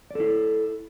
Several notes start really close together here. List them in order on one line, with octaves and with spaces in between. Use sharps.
D5 A4 E4